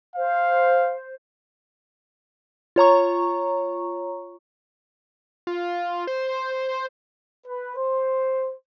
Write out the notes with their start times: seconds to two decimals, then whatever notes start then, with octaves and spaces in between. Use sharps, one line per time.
0.16 C5 F5
2.76 F4 C#5 A#5 C#6
5.47 F4
6.07 C5
7.47 B4
7.76 C5